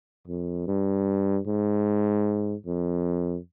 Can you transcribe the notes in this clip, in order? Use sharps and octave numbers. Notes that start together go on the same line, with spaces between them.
F2
G2
G#2
F2